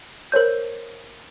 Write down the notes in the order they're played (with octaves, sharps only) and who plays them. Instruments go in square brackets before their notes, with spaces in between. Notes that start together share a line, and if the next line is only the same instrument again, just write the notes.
[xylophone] A#4 C5 C#5 G6